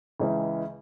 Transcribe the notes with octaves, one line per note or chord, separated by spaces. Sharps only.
C#2 C#3 E3 G#3